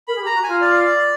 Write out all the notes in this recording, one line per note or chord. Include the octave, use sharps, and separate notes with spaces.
A#4 B5
G#4
G4
A#5
F#4
F4 G#5
D5